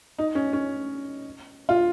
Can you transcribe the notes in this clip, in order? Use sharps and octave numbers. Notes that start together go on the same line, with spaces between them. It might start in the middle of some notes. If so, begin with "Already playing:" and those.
D#4
C#4
C#4
F4